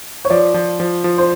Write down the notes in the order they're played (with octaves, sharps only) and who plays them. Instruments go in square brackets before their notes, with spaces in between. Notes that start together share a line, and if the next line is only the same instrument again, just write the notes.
[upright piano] C#5
[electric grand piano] F3 [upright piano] D5
[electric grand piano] F3
F3
F3
[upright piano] C5